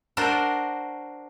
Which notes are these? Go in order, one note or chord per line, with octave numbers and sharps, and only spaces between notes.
D4 F#4 A#4 C5